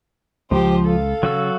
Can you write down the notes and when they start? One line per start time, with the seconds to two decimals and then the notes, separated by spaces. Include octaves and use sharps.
0.51 C#2 F3 G4 C5
0.85 A4 F5
1.23 C#3 F#3 F#4 E6